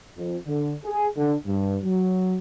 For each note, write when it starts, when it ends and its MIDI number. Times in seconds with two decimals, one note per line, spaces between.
0.18 0.38 41
0.47 0.75 50
0.85 1.07 68
1.17 1.36 50
1.47 1.78 43
1.84 2.38 54